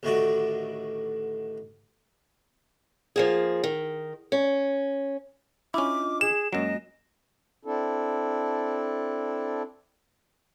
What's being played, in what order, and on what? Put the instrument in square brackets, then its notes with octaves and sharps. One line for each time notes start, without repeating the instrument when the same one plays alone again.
[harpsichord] A1 A2 D3 D#3 F#4 D5
[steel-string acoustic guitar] F3 A#3 G#4
D#3
C#4
[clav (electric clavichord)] C#4 E4 [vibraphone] D4 F4 D#5 [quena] D6
[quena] G#4 [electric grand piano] E7
[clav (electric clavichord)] F#2 F#3 [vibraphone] G#3 A#3 F#4 [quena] D#5
[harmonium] C4 D4 E4 A4